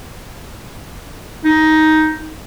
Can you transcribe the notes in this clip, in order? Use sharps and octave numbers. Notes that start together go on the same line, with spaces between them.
D#4